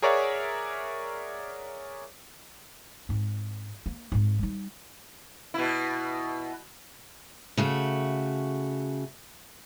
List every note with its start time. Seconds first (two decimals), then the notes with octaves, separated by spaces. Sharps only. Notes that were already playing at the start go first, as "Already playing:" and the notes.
0.02 G#4 A#4 C#5 D5 E5 F#5
3.09 G#2 C4
3.86 A#3
4.12 G#2 C4
4.39 G3 D#4
5.54 B2 E4
7.57 C#3 A3 F#4